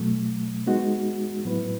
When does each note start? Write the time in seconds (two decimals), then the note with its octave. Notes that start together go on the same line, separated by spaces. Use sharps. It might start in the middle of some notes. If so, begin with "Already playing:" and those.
Already playing: B2 F#3 A3
0.67 G#3 B3 D#4 F#4
1.45 A2 F#3 B3 E4 B4